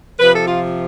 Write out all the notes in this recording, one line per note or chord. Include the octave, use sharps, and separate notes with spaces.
C3 F3 B4
A4
F4